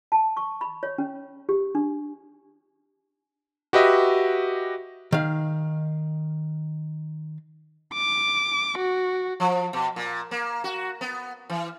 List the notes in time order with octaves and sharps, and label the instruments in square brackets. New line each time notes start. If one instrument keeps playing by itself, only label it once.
[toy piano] A5
C#6
B5
C#5
C#4
G4
D4
[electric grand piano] F#4 G4 B4 D#5 E5
[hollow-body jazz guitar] D#3 F5
[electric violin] D6
F#4
[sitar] F3
B2
A#2
A#3
F#4
B3
E3